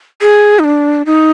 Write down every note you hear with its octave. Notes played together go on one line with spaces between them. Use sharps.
G#4
D#4
D4
D#4